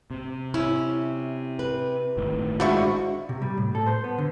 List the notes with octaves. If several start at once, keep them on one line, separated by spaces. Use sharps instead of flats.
C3
C#4 E4
B4
G1 A2 D#3
F3 G#3 D4 E4 F#4 C#6
C3
G3
A2
A4
C5
B3
D3